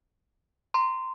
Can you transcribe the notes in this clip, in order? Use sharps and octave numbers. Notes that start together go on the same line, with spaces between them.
A#5 C6